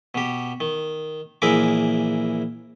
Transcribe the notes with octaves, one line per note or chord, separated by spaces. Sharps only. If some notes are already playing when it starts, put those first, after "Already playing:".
B2 G4
D#3
A#1 E3 E4 G#4 A#4 D6